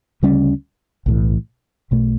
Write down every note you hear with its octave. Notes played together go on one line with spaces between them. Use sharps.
D2 C#3 G3 C#4
B1 A2 E3
B1 B2 A3